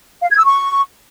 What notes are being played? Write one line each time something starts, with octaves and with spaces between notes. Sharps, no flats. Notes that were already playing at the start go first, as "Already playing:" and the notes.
F5
G#6
E6
C#6